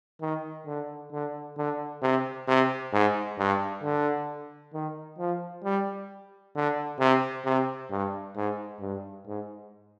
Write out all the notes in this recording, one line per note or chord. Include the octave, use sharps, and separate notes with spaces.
D#3
D3
D3
D3
C3
C3
G#2
G2
D3
D#3
F3
G3
D3
C3
C3
G2
G#2
G2
G#2